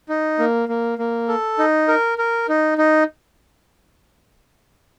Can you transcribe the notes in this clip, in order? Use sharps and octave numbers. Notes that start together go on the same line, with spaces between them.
D#4
A#3
A#3
A#3
A4
D#4
A#4
A#4
D#4
D#4